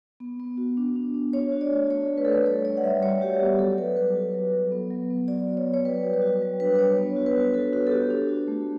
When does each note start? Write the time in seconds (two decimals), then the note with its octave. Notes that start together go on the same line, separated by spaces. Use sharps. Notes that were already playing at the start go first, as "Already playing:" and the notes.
0.20 B3
0.40 B3
0.58 F#4
0.77 D4
0.96 D4
1.14 D4
1.33 D4 C#5
1.52 F#4
1.61 D5
1.71 A3
1.90 A3 C#5
2.08 A3
2.18 B4
2.25 A4
2.28 A3 B4
2.46 G3 C#5
2.65 G3 D5
2.77 F#5
2.83 G3 E5
3.03 F#4 C#5
3.21 F#4 G4
3.40 B3 G4
3.59 F#3 A4
3.78 F#3 B4
3.97 F#3 B4
4.15 F#4
4.34 F#3
4.53 F#3
4.72 B3
4.91 F#3
5.10 B3
5.28 F#4 D5
5.48 F#3
5.57 C#5
5.66 F#3
5.74 C#5
5.85 G3 B4
6.03 F#4
6.14 B4
6.22 F#4
6.42 G3
6.60 D4 B4
6.75 B4
6.78 D4 C#5
6.97 B3 C#5
7.16 F#4
7.26 B4
7.36 F#4
7.54 F#4 A4
7.73 F#4
7.87 A4
7.91 F#4 G4
8.10 D4
8.29 F#4
8.48 A3